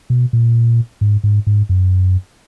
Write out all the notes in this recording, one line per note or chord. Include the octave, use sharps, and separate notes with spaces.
B2
A#2
G#2
G#2
G#2
F#2